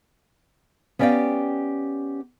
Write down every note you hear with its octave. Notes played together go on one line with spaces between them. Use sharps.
B3 C#4 G4 D5 F5 G5